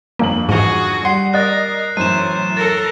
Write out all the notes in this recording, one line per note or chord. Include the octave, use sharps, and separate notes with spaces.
G1 F2 A#3 F#7
G#2 E3 F#4 G#4
G3 F#5 C6 C7
A#4 D5 D#5 F#6 A6
F#2 A2 E3 C5 D#7 E7
A4 A#4 A6